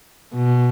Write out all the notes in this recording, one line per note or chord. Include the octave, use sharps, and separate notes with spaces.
B2